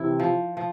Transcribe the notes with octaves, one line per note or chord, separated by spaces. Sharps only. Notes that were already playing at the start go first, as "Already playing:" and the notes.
Already playing: C3 E3 E4
F3
F3